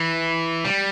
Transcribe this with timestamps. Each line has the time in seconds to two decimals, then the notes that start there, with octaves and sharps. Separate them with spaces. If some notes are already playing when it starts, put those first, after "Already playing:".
Already playing: E3
0.65 G3